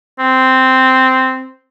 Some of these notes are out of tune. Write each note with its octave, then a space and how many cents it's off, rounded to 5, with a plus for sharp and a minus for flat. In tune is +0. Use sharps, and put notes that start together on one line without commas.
C4 -5